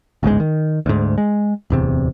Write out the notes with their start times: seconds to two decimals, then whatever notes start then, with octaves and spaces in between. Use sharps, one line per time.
0.23 G1 C#2 G#2 G#3
0.40 D#3
0.86 D2 G#2
1.18 G#3
1.70 D1 E2 C3